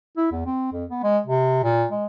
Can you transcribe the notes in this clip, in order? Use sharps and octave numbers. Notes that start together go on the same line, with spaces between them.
E4
E2
C4
F2
B3
G#3
C3
A#2
G#3